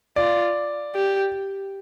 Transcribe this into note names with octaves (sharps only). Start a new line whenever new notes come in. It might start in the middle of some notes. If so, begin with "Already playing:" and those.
F4 D5
G4